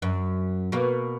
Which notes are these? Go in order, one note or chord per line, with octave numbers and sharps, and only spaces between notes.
F#2
B2 A#3